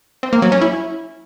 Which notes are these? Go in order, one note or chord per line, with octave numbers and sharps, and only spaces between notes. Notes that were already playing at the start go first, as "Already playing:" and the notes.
C4
A#3
F#3
C#4
E4